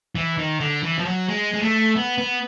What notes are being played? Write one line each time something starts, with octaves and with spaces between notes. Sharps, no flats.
E3
D#3
D3
E3
F3
F#3
G#3
G#3
A3
B3
B3